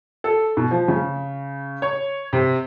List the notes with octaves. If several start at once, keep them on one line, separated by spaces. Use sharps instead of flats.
A4
B2
F3
C#3
C#5
C3